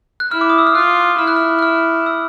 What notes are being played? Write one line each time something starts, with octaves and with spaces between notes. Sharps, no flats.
F#6
E4 F6
D6
D#6
E6
F6
F4 F#6
E4 F6
F#6
F6
F#6
F6
E6